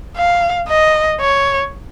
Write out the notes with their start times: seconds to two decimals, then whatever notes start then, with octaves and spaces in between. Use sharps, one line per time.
0.17 F5
0.69 D#5
1.20 C#5